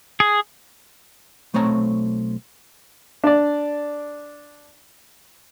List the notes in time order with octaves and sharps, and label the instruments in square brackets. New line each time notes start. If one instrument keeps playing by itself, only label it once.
[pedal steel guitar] G#4
[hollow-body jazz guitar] B1 A3 C4 C#5 A5 A#5
[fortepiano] D4 D5